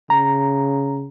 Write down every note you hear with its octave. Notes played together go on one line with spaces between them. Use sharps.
C#3 A#5